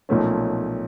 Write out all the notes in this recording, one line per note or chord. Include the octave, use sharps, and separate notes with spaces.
B1 A#2 F3 A3 C#4